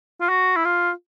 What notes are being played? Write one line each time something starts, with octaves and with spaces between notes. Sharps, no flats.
F4
F#4
E4
F4